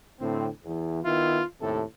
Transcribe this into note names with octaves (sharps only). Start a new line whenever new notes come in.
A2 D3 C4
E2
D#3 B3 E4 F4
D#2 A2 C3 A4